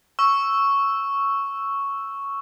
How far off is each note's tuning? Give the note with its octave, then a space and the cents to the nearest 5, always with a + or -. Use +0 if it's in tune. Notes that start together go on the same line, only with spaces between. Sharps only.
C#6 +0 E6 +0